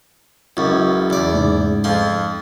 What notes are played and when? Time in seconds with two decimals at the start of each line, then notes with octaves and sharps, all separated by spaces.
0.57 C#2 F#2 C#4 E4
1.10 E2 D5
1.33 G#2 C#3
1.84 F2 F3 C6